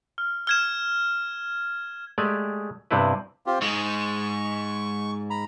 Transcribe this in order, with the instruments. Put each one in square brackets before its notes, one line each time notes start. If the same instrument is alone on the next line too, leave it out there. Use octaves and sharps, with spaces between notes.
[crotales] F6
F6 G#6 E7
[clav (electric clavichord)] G#3 A3 G4 D5 G#5
G2 C3 B3 C4 E4 B4
[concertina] C4 F4 G4
[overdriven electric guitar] G#2 G#3 [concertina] C#6
[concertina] A#5 B5